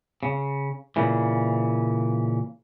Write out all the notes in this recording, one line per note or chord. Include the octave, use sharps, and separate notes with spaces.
C#3
A#2 C#3 E3